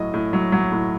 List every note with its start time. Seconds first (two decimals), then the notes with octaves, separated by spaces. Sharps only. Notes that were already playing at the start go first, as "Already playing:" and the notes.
Already playing: A2 F#3 D#5
0.14 A2
0.33 F#3
0.52 F#3
0.72 A2